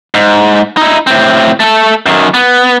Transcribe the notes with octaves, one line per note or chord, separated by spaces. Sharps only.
G#2
D#4 E4
A2 C4
A3 A4
F#2 D#3
B3